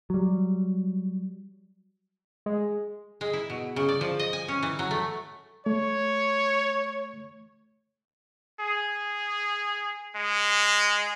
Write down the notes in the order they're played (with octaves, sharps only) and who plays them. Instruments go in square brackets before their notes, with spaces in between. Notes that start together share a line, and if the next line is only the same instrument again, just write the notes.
[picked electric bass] F#3 G3
[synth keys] G#3
[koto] G#3
E4
B2
C#3
D5
F3
D#5
G#5
C#4
E3
F#3
A3
[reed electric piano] A3 [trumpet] C#5
[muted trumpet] G#4
G#3